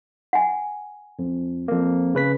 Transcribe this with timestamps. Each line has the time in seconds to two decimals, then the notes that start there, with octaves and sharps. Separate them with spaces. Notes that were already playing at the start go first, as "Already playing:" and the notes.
0.33 F#5 G#5
1.19 F2
1.68 F2 A#3
2.15 C#3 B4 B6